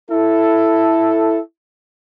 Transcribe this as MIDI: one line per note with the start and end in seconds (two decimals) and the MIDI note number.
0.11 1.38 64
0.11 1.38 69